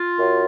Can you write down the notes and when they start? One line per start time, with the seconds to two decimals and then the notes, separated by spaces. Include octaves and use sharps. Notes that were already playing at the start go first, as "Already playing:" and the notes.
Already playing: F4
0.17 F#2